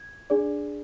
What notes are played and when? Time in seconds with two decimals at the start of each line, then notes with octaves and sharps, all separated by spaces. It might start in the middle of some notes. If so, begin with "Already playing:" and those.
Already playing: G#6
0.30 D4 G#4 D5